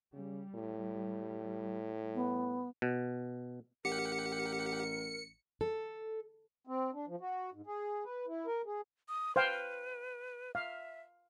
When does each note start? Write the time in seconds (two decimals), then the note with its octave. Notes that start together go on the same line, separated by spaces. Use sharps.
0.13 C#3 G3
0.55 A2
2.14 B3
2.82 B2
3.85 A1 G4 A#4 F#5 C#7
5.61 A4
6.67 C4
6.94 D4
7.07 F3
7.21 F#4
7.53 G#2
7.67 G#4
8.04 B4
8.27 E4
8.46 A#4
8.66 G#4
9.09 D#6
9.36 B4 C5 F5 G5
10.55 E5 F5